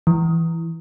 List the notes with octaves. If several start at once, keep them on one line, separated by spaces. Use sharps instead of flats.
E3